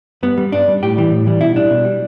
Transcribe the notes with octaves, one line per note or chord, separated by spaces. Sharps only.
G2 B3
G3
G2 D4
G3
A2 G4
E3 G3
A2
E3 G3
B2 E4
G3 D4
B2
G3